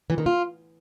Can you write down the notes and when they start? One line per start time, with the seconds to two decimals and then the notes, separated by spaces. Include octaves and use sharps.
0.10 E3
0.18 D#3
0.26 F4